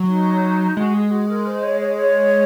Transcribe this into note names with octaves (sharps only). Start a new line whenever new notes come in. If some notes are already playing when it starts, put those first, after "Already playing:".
Already playing: F#3
D#4
G#3 F#4
G#4
F#4
A#4
C5
C#5
C#5
C#5